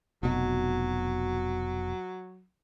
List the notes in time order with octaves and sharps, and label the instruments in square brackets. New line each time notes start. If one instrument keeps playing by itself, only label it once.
[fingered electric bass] F1 B2 [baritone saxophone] F#3